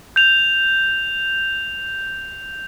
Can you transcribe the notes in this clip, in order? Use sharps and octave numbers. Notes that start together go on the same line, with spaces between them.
G6 F7